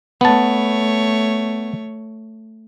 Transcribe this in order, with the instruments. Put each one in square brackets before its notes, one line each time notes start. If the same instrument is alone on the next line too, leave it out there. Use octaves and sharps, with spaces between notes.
[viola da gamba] A3 C#5 [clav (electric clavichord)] B3 A5